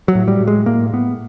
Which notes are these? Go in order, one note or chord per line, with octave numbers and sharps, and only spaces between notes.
F#3
A2
G3
A2
G#3
A2 A#3
A2 B3